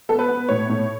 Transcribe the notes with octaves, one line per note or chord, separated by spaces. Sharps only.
B3 A4
B4
B3
A2 C#5
A2